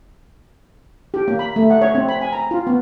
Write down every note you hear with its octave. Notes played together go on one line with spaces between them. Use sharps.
G4
A#3
B5
A3
F#5
C#5
C4
B5
G#5
A#5
F4
B3